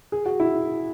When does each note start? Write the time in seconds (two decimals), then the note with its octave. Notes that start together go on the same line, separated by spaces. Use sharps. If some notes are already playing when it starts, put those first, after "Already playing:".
0.12 G#4
0.26 F#4
0.40 E4